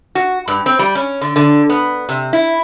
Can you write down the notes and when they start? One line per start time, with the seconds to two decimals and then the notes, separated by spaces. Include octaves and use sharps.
0.15 F#4
0.48 G2
0.66 C4
0.79 G3
0.95 C#4
1.21 D3
1.36 D3
1.69 B3
2.09 C3
2.33 E4